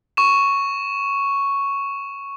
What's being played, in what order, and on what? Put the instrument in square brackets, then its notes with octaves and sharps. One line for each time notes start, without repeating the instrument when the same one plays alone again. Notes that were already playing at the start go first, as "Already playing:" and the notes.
[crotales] C#6 E7